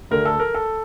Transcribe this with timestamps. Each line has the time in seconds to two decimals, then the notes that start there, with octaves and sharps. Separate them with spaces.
0.11 D2 D3 A3 A#4
0.25 A4
0.39 A#4
0.54 A4